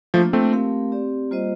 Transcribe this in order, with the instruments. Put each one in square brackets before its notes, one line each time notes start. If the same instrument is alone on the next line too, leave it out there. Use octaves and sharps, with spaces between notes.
[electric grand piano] F3 A3 [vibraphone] A#3 D4 F4
[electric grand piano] A3 C4
[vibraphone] A3 C4 G4 A#4 F5
C4 G4 D5
G3 A#3 F4 C5 D#5